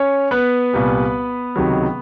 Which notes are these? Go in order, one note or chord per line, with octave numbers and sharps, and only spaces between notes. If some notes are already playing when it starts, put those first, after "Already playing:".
Already playing: C#4 C#5
B3 B4
C2 A#2 G3
C#2 C3 D#3 F#3